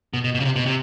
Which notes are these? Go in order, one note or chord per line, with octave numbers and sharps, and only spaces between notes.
B2
B2
B2
C#3
C3
B2
C3